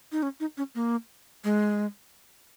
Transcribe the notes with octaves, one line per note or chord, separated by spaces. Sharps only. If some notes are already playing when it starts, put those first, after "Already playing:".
D#4
C#4
D#4
C#4
A#3
G#3